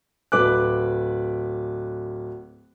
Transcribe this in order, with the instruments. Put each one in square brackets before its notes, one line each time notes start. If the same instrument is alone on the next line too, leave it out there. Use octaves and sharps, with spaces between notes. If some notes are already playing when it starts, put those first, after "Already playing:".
[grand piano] D1 B4 D6 F#6